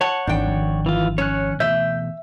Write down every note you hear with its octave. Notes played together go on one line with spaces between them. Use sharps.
C#5 F#5 A5
G#1 E2 E3 D4 G5
D#3 F3 G3
E3 F4
C#4 C#5 F#6
B2 E3 A3 E5 G6